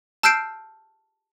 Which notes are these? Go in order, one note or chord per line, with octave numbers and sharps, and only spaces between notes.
A5 E6 F6 G6 C7 D7